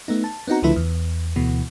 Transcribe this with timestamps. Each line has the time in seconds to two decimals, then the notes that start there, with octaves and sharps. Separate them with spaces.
0.08 A3 B3 D#4
0.24 A5
0.47 B3 C4 D#4 F#4 A#5
0.62 C#2 D3 F3 A3 E4 B4
0.76 E2
1.36 D2 B2 E3